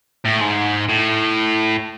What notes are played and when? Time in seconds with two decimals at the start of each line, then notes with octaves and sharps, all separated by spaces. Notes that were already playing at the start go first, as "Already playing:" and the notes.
0.25 A2
0.40 G#2
0.89 A2